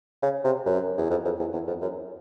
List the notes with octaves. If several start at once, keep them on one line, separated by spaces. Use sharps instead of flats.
C#3
C3
F#2
E2
F2
F2
E2
E2
F2
F#2